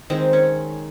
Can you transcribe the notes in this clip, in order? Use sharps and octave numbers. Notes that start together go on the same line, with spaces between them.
D#3 G#3 C4
C#4